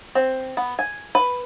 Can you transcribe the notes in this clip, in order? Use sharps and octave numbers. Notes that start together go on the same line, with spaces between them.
C4
B3
G#5
B4